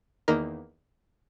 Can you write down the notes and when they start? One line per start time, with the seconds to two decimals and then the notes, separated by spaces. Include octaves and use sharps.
0.28 E2 D#3 A#3 D#4 A#4